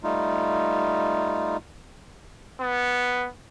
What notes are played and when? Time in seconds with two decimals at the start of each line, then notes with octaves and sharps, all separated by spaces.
0.03 G3 A3 D#4 F4
2.61 B3